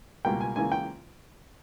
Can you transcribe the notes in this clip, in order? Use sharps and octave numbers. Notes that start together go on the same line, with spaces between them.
C#2 B2 G3 A#3 G5
G#5
C#2 C#3 E3 A#3 G#5
G5